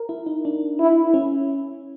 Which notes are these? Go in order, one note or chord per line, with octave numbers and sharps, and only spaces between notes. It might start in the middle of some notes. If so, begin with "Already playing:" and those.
Already playing: A#4
E4
D#4
D4
E4
C#4